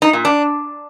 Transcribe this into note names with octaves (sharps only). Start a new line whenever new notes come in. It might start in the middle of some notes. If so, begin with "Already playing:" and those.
D#4
A#2
D4